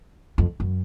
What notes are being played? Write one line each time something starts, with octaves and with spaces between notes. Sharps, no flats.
F2
F#2